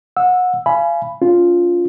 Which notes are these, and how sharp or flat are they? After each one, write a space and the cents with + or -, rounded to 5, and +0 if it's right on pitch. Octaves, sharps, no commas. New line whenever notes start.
F#5 -25 E6 +0
F5 -35 G#5 +20 B5 +0
C#4 +30 F4 +0